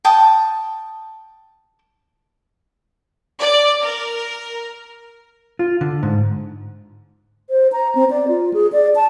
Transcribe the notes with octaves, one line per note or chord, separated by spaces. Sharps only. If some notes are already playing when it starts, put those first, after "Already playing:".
G5 A5 D#6
D5
A#4
F4
D3
G#2
C5
A#5
C4
D5
F4
G#4
D5
A5